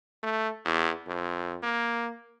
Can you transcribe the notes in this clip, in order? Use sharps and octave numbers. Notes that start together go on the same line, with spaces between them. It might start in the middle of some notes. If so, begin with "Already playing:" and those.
A3
E2
F2
A#3